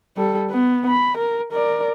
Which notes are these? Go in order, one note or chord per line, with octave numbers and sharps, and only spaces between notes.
G3 A4
B3
B5
A#4
A#4 D5